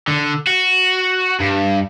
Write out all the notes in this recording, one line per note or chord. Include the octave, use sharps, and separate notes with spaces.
D3
F#4
G2